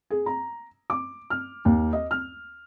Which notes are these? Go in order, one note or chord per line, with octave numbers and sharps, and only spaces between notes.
G#4
A#5
D6
F6
D#2
D#5
F6